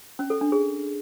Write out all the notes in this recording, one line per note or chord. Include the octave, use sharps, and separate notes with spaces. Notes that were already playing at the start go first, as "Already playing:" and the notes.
C#4
A4
D4
G#4